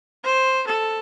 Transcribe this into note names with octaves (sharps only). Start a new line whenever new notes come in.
C5
A4